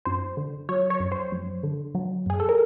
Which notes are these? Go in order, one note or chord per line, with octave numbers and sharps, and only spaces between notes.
F#2 C5
D3
F#3 C#5
C#5
F#2
C5
F#2
D3
F#3
F#2 G#4
A4
A#4